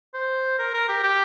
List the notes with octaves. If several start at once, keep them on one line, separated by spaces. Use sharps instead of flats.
C5
A#4
A#4
G4
G4